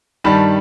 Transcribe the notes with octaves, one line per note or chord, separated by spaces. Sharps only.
G2 D#3 G3 A5 B5